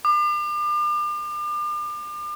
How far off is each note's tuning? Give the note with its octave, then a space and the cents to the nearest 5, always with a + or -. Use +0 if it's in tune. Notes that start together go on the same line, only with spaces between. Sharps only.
D6 +40